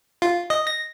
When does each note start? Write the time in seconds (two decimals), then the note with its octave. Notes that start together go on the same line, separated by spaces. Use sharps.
0.22 F4
0.50 D#5
0.67 A#6